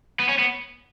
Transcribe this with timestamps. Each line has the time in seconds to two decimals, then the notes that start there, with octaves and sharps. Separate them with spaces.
0.19 B3
0.28 C#4
0.39 B3